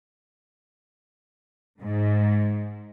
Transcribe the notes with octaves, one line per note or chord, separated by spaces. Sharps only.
G#2